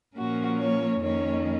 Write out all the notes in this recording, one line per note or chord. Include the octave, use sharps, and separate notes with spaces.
A#2 F3 A#3 C#4 F#4
C#5
F2 D#3 A#3 C#4 C#5